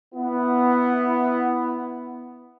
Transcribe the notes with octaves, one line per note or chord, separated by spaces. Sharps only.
B3 E4